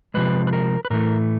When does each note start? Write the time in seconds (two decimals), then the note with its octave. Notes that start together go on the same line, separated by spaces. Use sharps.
0.14 C3 F3 G#3 B4
0.47 B4
0.53 A#4
0.85 B4
0.90 A2 E3 A3 A#4